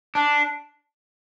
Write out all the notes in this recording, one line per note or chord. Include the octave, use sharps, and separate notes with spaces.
D4